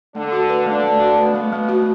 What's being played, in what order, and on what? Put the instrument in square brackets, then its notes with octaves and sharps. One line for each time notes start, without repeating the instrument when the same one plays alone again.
[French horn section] D3 D4 [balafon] A3
[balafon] F#4
B4
[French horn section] D3 D4 [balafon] A3
[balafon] A3
F#4
[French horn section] B2 B3 [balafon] B4
[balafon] A3
A3
F#4